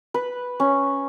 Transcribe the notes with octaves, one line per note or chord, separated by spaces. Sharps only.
B4
C#4